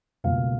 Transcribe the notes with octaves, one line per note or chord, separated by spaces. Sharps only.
C#2 B2 G3 A#3 F5